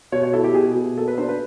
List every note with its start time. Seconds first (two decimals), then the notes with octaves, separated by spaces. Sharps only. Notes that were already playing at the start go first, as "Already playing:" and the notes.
0.12 B2 C#5
0.23 C#5
0.33 E4 A4
0.44 G4
0.54 B2 G#4
0.76 B2
0.97 A#3 A4
1.08 B4
1.18 D4 C5
1.28 B4